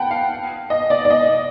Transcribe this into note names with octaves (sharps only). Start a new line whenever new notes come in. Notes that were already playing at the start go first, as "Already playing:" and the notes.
Already playing: F#5 G5 A5 B5
F5
D#5
D5
D5
D#5